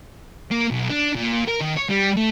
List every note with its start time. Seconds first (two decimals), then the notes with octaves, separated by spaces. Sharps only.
0.51 A#3
0.71 B1
0.90 D4
1.15 A#2
1.47 A#4
1.60 D#3
1.76 C#5
1.89 G3
2.17 A3